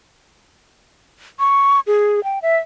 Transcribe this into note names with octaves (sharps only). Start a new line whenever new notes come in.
C#6
G#4
G5
E5